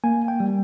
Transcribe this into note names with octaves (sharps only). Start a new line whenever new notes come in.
A#3 G#5
G5
G3